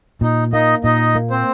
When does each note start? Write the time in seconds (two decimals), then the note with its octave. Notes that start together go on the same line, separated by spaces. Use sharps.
0.21 A#2 D#4
0.53 A#3 D#4 D#5
0.84 A#2 D#4 D#5
1.15 A#3
1.31 C4 C5